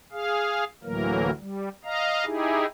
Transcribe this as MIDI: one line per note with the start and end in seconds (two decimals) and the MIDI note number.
0.12 0.64 68
0.12 0.64 77
0.83 1.30 38
0.83 1.30 45
0.83 1.30 52
0.83 1.30 54
0.83 1.30 58
0.83 1.30 70
1.39 1.69 55
1.85 2.25 75
1.85 2.25 77
1.85 2.25 82
2.25 2.66 63
2.25 2.66 64
2.25 2.66 67
2.25 2.66 68